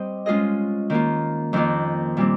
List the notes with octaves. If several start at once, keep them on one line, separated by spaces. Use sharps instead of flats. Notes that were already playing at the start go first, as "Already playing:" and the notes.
Already playing: G3 C4 G4 C5 D#5
G#3 C#4 F4 G#4 D#5
D#3 A#3 F4
F2 D#3 A#3 F4
A#2 G3 C4